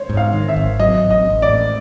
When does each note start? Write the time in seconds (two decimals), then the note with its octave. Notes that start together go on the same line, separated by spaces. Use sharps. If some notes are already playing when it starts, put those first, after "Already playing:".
Already playing: C5 C#5
0.09 G#2
0.17 F5
0.33 D#3
0.48 E5
0.56 G#1
0.80 F#3 D#5
1.03 A1
1.11 D#5
1.26 A1
1.42 D5
1.50 A2